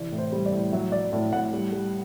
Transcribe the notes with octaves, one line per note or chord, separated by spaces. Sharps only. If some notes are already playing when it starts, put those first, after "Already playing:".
Already playing: C3 E3 D5
A2
C5
G3
D5
A2
F#3 E5
F#3 D5
A2 D5
A2 F#5
G3
G3